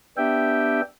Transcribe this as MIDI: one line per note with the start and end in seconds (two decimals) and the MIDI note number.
0.17 0.81 59
0.17 0.81 62
0.17 0.81 67
0.17 0.81 76
0.17 0.81 79